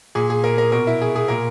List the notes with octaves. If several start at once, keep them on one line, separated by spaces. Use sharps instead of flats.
A#2 G#4
G#4
A#4
A#4
B2 A#4
E4
G#4
G#4
A#2 A#4